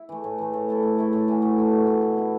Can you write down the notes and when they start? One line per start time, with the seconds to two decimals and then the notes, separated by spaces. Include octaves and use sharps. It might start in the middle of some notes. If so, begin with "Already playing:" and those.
Already playing: E4
0.09 E3 A3
0.24 A2
0.38 E3 A3
0.54 A2
0.69 A3 E4 A4
0.83 A2
0.98 A3 E4 A4
1.13 A2
1.28 E3 A3 F#4
1.42 A2
1.58 E3 A3 F#4
1.72 B2
1.87 B3 E4 A4
2.02 B2
2.17 B3 E4 A4